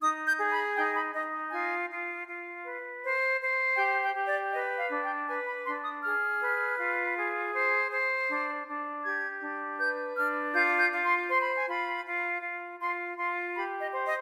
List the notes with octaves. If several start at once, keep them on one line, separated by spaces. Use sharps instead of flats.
D#4 D#6
G6
G#4
B5
D#4 G5
B5
D#4 D#5
F4 G#5
F4
F4
B4
C5
C5
G4 G5
G5
G4
D5
B4 D#5
F5
D4
G5
B4 G#5
B5
D4 C6
D#6
G#4 F6
B4
F4
G#4
C5
C5
D4
D4
G4 G#6
D4
B4 G6
D4 F6
F4 G6
G6
F4
C6
C5 C6
B5
G#5
F4 B5
F4
F4
F4 C6
F4 C6
G4 B5
D#5
C5
D#5